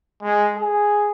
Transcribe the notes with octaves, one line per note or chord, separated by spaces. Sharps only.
G#3
G#4